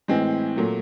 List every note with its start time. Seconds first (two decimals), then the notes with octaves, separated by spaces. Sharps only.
0.08 A2 E3 G#3 C4
0.56 A#2 F#3 A3